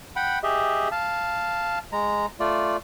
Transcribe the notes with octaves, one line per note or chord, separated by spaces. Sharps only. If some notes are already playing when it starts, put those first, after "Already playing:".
F#5 G5 B5
G4 G#4 D#5 E5
F5 A5
G#3 A#5
A3 F4 D5